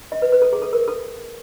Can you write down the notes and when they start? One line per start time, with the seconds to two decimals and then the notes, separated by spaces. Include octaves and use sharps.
0.12 D#5
0.22 B4
0.32 B4
0.42 A4
0.53 G#4
0.62 A4
0.73 A#4
0.88 A4